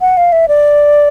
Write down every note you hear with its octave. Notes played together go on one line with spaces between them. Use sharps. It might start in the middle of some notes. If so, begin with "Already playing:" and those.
F#5
F5
E5
D5